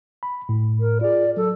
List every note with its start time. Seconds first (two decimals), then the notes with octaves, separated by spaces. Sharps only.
0.23 B5
0.49 A2
0.80 A#4
1.01 F4 G#4 D5
1.37 F#3 A4